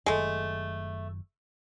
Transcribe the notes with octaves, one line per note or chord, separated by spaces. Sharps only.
F#1 F#2 D#3 G#3 A3